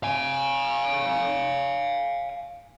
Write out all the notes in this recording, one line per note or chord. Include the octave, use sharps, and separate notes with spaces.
F5 G#5